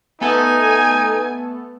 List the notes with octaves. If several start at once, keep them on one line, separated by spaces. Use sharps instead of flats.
A3 B3 D#4 A4 G#5